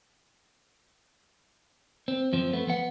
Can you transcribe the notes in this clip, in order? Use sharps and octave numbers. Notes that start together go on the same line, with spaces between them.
C4
F#2 F3 C4
A3 B3
F3 B3 F#5